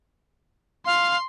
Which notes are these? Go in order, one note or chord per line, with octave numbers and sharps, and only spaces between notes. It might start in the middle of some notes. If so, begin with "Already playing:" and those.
F5 C6